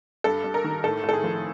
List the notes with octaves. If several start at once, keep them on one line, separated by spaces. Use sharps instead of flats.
G2 A4
G2
A#4
D#3
A2 A4
A2
A4
G#4
F3